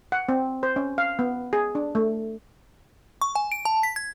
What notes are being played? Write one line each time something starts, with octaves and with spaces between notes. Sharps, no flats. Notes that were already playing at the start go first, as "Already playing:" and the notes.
F#5
C4
C5
C#4
F5
B3
G#4
D4
A3
C#6
G#5
D7
A5
B6
G#6